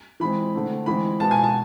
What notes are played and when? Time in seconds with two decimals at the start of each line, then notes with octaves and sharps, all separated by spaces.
0.20 E3 G#3 C4 B5
0.54 D3 A3 C4
0.86 E3 G#3 C4 B5
1.20 B2 G#3 B3 A5
1.31 G#5
1.44 A5